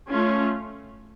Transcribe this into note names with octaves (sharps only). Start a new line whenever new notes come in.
A3 C#4 F4